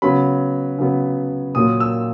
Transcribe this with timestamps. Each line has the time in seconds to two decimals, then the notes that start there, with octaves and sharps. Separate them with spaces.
0.02 C#3 F#3 B3 B5
0.78 C#3 F#3 B3
1.55 A#2 F#3 A#3 D#6
1.80 E6